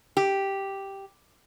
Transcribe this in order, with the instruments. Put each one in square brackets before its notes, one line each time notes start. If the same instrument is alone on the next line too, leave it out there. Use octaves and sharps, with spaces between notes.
[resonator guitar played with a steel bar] G4